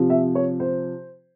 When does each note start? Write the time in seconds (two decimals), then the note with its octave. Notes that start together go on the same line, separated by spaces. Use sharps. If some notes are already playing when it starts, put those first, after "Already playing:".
Already playing: C3 F3
0.10 E5
0.35 C#5
0.60 C5